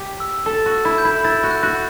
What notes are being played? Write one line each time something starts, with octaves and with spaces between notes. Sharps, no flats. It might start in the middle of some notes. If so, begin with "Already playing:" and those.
Already playing: G4 B6
E6
A4 E6
F#4
E6
E4
G6
E4
E4 A6
F#4
F#6
F#4